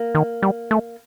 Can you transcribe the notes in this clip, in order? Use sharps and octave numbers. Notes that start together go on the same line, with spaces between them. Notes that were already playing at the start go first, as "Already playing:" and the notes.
Already playing: A#3
D#3
G3
A3